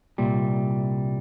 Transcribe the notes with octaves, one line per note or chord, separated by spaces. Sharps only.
C2 A#2 G3